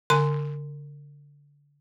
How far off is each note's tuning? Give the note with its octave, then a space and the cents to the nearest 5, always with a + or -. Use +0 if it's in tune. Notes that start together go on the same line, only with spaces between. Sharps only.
D3 -30 G#5 +0 C6 -15